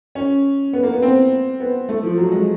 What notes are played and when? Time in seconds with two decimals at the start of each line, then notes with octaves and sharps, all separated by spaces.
0.15 C#4
0.73 B3
0.83 A#3
0.93 B3
1.02 C4
1.60 B3
1.89 A3
2.03 F3
2.18 F#3
2.32 G#3